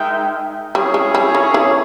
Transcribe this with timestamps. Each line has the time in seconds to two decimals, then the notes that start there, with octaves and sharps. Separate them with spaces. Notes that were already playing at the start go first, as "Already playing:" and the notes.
Already playing: G#3 D#4 A#4 E5 G5
0.75 G3 C#4 E4 G#4 C#5
0.94 G#3
1.15 G3
1.35 D#3
1.54 E3